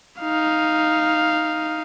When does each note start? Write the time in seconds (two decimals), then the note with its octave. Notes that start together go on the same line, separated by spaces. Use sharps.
0.20 D#4 F5